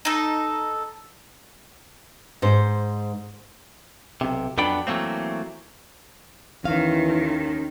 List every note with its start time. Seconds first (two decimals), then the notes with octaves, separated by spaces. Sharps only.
0.05 D#4 A4
2.42 G#2 C5
4.21 B1 C3
4.57 F2 F#3 B3 D4 G5 B5
4.87 E3 F#3 A3 A#3 C4
6.64 D#2 D#3 E3 C#4 F5